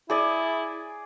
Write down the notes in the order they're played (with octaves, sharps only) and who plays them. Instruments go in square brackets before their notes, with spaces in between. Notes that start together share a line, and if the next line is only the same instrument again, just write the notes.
[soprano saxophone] E4 [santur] G#4 D5